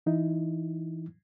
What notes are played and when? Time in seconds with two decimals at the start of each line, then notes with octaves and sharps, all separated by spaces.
0.06 E3 D#4 E4